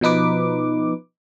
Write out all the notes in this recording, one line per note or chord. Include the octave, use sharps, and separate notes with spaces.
B2 F3 D#4 B4 D6